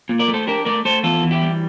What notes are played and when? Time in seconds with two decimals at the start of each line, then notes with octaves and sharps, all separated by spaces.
0.09 A#2
0.19 A#4 D5
0.28 A3
0.34 A4 C5
0.47 D4 G4 A#4
0.65 A3 A#4 D5
0.85 A3 A4 C5
1.03 E2 F4 A4
1.22 E3
1.31 E4 G4
1.42 G3